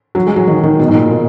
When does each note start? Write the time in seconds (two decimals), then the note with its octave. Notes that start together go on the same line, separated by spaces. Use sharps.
0.15 F#3
0.27 G#3
0.36 F#3
0.47 D#3
0.63 D#3
0.79 B2
0.88 G#2
0.95 A#2
1.11 A#2